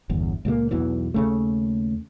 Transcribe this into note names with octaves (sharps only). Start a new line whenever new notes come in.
G1 E2
C#2 A#2 G3 A#3
B1 E2 B2 E3
D#2 C#3 A3